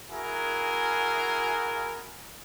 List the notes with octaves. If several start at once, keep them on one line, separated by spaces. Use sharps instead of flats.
E4 F#4 G#4 A#4 G#5